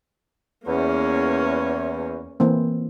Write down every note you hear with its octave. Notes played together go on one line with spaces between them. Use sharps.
E2 A#3 C#4
E3 A#3 C4